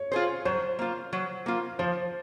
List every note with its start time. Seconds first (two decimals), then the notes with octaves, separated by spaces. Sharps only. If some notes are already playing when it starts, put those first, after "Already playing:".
Already playing: C#5
0.12 F4 G#4 C5
0.45 F#3 C5
0.79 A#3 F4
1.13 F#3
1.46 A#3 F4
1.79 F3 C5